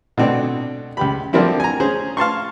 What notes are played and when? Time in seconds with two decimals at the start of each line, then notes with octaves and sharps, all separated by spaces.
0.18 B2 D3 C4 D4
0.97 C#2 G4 B5
1.33 D3 F3 G3 A#3 C4 E4
1.60 G#5 A#5
1.80 C#4 G#4 C5
2.17 F5 A5 C6 C#6